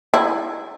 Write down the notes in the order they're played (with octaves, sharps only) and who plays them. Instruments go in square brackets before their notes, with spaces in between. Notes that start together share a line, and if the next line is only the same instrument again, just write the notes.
[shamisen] E4